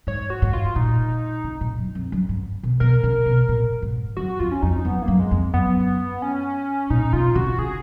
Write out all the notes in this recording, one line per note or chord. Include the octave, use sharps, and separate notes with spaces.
G#2 C#5
F#4
G#2
F4
A#2 D#4
C#3
A#2
F#2
F2
F#2
G#2
B2
B2 A#4
C#3
B2
A#2
G#2
F#2 F#4
F2 F4
C#4
F2 D#4
F#2 B3
A#3
F#2
G#3
F2
F#2 B3
C#4
A#2 D#4
B2 F4
C#3 F#4
C#3 G#4